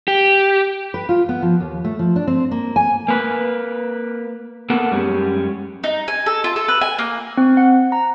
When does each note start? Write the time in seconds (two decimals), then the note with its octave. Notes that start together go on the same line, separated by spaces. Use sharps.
0.08 G4
0.94 B4
1.09 F4
1.29 B3
1.42 F3
1.60 D#2
1.85 A3
1.99 F3
2.16 D4
2.27 C4
2.51 A#3
2.76 G#5
3.08 A#3 B4
4.70 A#3 B3 A4 A#4 F#5
4.91 F#2 G3 G#3 C#4
5.84 D#4
6.08 G#5
6.26 A4
6.44 F4
6.56 A4
6.68 B4
6.81 G#5
6.98 A#3
7.37 C4
7.57 F#5
7.92 A#5